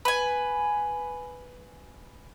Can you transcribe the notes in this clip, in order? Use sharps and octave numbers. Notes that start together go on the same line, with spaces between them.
B4 G#5